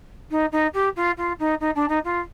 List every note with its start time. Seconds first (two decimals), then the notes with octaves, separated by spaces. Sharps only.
0.31 D#4
0.52 D#4
0.74 G4
0.96 F4
1.17 F4
1.39 D#4
1.60 D#4
1.75 D4
1.89 D#4
2.04 F4